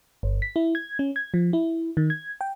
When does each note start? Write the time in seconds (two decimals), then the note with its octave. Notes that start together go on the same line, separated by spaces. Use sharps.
0.23 G1
0.42 B6
0.56 E4
0.75 G#6
0.99 C#4
1.16 G#6
1.34 F3
1.53 E4
1.97 D#3
2.10 G#6
2.41 G5